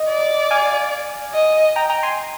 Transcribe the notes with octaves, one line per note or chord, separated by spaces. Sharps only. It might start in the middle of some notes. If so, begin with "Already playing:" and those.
Already playing: D#5
D5
F5 G#5
D#5
G5 A#5
G5 A#5
G#5 C6